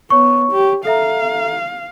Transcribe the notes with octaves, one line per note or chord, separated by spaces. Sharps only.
B3 C#5 C#6
G4
A4 E5 F5 A#5